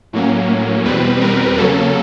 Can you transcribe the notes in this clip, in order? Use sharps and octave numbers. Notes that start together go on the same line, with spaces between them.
A2 F#3 A#3 C#4
E2 B2 G3 C4 B4
A#4
C#3 F#3 A#3 C#4 A4